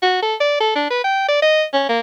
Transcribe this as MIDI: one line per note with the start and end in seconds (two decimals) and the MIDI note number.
0.02 0.20 66
0.22 0.35 69
0.40 0.57 74
0.60 0.73 69
0.75 0.86 62
0.90 1.03 71
1.04 1.23 79
1.28 1.40 74
1.42 1.63 75
1.73 1.84 61
1.89 2.00 58